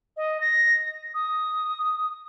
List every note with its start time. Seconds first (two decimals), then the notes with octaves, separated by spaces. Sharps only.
0.17 D#5
0.41 A#6
1.14 D#6